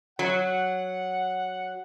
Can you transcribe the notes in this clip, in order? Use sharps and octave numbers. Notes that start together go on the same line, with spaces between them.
F#3 F#5